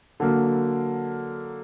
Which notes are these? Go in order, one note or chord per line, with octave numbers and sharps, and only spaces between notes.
D3 F#3 A#3